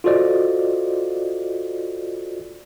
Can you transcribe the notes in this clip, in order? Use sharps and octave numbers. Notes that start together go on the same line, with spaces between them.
F4 F#4 A4 C5 D5 D#5